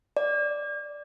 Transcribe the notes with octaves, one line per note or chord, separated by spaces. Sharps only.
D5